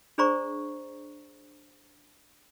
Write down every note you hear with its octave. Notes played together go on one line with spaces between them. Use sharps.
D4 G#4 C5 D5 A#5 C#6